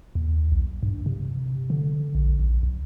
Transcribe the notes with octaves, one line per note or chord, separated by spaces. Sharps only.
D#2
B1
G2
C3
D3
A#1
A#1
B1